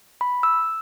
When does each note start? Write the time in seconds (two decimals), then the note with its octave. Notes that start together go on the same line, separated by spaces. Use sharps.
0.21 B5
0.43 E6